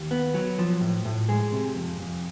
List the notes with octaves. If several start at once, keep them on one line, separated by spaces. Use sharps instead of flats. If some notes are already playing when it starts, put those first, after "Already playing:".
Already playing: D#2
B3
F#3
F3
A2
A2
G#3
C3
F2
F2